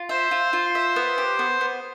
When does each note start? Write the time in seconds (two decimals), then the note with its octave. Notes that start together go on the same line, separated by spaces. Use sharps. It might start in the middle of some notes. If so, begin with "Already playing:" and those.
Already playing: F4
0.09 C5 E5
0.31 F4
0.53 F4
0.75 E5
0.96 B3
1.18 G4
1.39 B3
1.61 B3